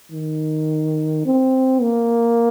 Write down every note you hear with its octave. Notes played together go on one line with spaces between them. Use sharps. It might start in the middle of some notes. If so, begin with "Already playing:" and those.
D#3
C4
A#3